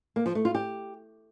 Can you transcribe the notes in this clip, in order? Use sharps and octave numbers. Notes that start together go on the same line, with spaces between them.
A#3
F3
A3
F4
G4